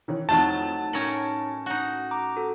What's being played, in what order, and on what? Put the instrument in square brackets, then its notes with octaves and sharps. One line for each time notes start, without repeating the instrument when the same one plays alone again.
[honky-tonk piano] D#3 E3 C#4
[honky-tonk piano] F2 E3 [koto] F#3 A3 [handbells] D#4 A6 [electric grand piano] A5
[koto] A2 C#4 A#4 [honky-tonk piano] G#5 C#7 F#7
[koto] D#4 F#4
[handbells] A#5 D6
F#4 A4